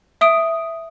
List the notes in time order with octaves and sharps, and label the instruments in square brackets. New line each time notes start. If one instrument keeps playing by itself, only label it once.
[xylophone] E5 D#6 D7